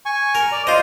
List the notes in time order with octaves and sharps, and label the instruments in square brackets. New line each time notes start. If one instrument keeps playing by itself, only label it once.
[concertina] G#5 C#6
[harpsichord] A#4
[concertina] D5
[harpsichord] F4 D#5 [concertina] C5